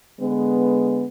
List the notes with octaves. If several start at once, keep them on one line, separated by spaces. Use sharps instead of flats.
D3 G#3 B3